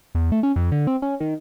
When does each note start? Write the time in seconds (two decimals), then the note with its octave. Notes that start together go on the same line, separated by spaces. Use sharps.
0.15 E2
0.32 A3
0.43 C#4
0.56 F2
0.72 D3
0.87 C4
1.02 C#4
1.20 D#3